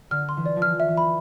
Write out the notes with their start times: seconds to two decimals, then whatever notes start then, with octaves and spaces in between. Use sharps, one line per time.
0.11 D3 F6
0.29 C6
0.37 E3
0.46 D5
0.56 F3
0.62 E3 F6
0.80 E5
0.88 E3
0.97 B5